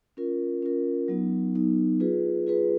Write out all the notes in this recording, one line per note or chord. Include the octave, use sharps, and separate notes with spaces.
C#4 F4 A#4
C#4 F4 A#4
F#3 B3 D#4
F#3 B3 D#4
F4 G#4 B4
F4 G#4 B4